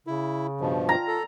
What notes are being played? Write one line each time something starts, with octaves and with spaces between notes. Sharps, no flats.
C#3 E4
G2 B2 F3
F4 A#5
A4